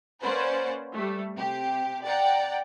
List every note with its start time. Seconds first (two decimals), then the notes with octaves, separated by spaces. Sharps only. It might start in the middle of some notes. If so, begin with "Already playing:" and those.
0.23 A#3 C#4 B4 C5 D5 F#5
0.93 G3 A3
1.36 C3 G4
2.04 D5 F#5 G5 A#5